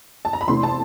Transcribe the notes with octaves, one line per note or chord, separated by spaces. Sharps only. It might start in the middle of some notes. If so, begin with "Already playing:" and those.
A5
A#5
B5
E2 C3 E3 A3 C6
A5